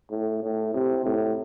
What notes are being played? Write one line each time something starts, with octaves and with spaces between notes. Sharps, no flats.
A2
A2
C3
A2